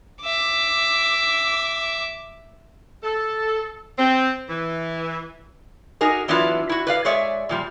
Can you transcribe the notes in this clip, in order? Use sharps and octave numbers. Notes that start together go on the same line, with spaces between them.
E5 D6
A4
C4
E3
D#4 F#4 G#4 A#4
E3 F#3 B3 D4 E4 F4
E4 F#4
B4 D5 F5
G#3 G#4 C#5 D5 E5
A#2 F3 G3